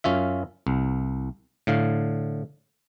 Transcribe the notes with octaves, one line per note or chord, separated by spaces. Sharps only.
F#2 C#4 F4 E5
C2
A2 D3 F5